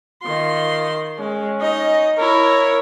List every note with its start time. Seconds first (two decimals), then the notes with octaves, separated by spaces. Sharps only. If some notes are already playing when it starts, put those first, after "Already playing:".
0.23 D#3 F4 C6
1.19 G#3 C#4
1.61 D#4 D#5
2.18 E4 A#4 C#5